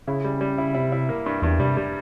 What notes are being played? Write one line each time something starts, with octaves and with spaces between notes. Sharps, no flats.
C#3 E4
G3
G3
E4
C3 E4
E4
A#3
G2
E2 G2
C3 G3
G3